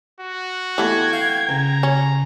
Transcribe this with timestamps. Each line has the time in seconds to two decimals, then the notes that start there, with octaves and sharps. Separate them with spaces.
0.20 F#4
0.78 E3 A3 B3 G5 G#6
1.13 F5
1.49 C#2 A#5
1.83 C#4